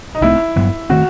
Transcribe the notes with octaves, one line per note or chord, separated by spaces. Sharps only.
D#4
C2 B2 A3 C4 E4
G2 F#3 B3
D#3 A3 C4 F#4